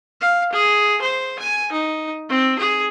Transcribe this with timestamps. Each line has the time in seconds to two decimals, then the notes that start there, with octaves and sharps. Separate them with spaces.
0.21 F5
0.52 G#4
1.02 C5
1.40 G#5
1.72 D#4
2.30 C4
2.59 G#4